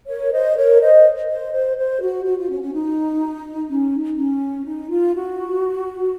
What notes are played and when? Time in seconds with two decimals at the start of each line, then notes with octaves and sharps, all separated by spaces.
0.08 A#4 C#5
0.32 C5 D#5
0.56 A#4 C#5
0.81 C5 D#5
1.29 C5
1.53 C5
1.77 C5
2.00 F#4
2.24 F#4
2.38 F4
2.50 C#4
2.61 C#4
2.74 D#4
3.69 C#4
3.94 D#4
4.17 C#4
4.66 D#4
4.90 F4
5.15 F#4